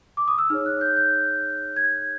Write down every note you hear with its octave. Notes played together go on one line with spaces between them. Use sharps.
D6
D#6
E6
D#4 G#4 C#5 F6
F#6
G6
G6
G#6